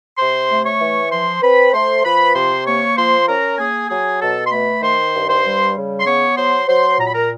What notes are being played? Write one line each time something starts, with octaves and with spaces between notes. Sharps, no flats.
C3 C5 C6
A3
C#5 C#6
E3
F3 C5 C6
C4 B4 B5
A3 C5 C6
F3 B4 B5
C3 C5 C6
A#3 C#5 C#6
F3 C5 C6
C#4 A#4 A#5
A#3 G#4 G#5
F#3 G#4 G#5
B2 A4 A5
C6
A3 B4 B5
D#3 C5 C6
G2
C5 C6
G3
C#3
C6
B3 C#5 C#6
F#3 C5 C6
F#3 C5 C6
A#2 A#5
B5
A#4 A#5